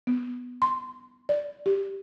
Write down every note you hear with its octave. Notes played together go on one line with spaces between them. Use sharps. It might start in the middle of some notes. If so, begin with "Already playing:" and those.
B3
C6
D5
G4